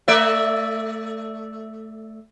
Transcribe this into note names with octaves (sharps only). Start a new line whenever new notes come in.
A3 D5 E5